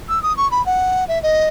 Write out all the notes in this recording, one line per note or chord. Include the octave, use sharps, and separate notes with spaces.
E6
D#6
C#6
B5
F#5
E5
D#5